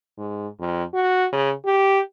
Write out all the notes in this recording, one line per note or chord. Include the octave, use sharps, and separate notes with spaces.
G#2
F2
F#4
C#3
G4